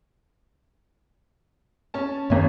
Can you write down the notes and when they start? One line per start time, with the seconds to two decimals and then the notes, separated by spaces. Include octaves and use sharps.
1.94 C#4 A5
2.30 G#1 F#2 A#3 C#5